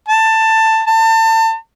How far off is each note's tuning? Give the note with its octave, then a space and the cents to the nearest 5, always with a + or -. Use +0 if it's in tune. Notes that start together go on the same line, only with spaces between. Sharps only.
A5 +15
A5 +30